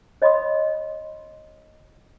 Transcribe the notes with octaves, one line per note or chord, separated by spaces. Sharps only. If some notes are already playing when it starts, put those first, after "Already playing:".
C#5 D#5 F5 B5 C6 D#6